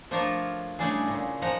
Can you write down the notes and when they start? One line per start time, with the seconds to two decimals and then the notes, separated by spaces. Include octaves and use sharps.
0.11 F3 A3 D4 F4 A#4 C#5
0.79 C#3 G3 A3 D4 E4 G#4
1.07 A#2 C#3
1.42 F3 G#3 D#4 F#5 A#5